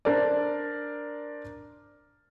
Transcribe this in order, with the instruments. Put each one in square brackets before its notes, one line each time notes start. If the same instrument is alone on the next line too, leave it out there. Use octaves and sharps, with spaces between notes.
[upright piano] D4 A#4 C5 D5